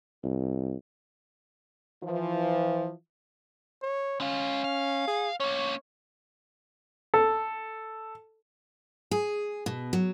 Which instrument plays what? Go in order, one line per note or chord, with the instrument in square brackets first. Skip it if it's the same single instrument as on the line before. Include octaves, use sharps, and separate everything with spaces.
[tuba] C2
[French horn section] E3 F3
[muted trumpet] C#5
[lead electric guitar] G#3 F5 [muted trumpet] C#4
[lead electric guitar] F5
[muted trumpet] G#4
[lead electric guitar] A#3 C#4 [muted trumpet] C#5
[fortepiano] A4
[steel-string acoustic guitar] G#4
B2
F#3